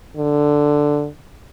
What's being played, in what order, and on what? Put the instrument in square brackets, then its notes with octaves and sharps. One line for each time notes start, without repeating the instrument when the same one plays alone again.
[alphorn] D3